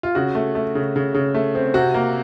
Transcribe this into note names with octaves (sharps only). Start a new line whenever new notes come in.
F4
C#3 F#4
A3
A3
C#3
C#3
C#3
A3
C4
C3 F#4
A#3